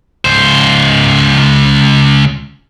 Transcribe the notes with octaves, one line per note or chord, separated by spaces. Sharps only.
C#2 C5